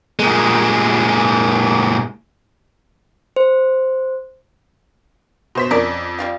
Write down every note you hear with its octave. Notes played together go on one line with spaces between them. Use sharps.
A#2 G#3
C5
B2 C5 B6
F2 C#4 A#4 D5
G3 F4 F5